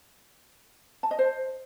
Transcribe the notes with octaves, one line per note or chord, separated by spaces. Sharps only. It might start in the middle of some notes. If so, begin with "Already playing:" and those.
A5
D#5
C5